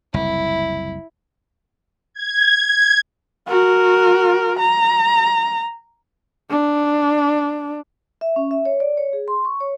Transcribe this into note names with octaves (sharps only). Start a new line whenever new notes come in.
F#1 C2 E4
G#6
F#4 A#4
A#5
D4
E5
C#4
E5
C#5
D5
C#5
G#4
C6
C#6
C#5